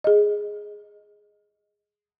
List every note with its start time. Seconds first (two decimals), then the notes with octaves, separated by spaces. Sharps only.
0.04 G#4 D#5